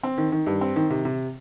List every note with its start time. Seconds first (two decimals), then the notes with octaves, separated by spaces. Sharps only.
0.03 C4
0.18 D#3
0.32 D#3
0.46 G2
0.61 C4
0.76 D#3
0.90 C3
1.05 C3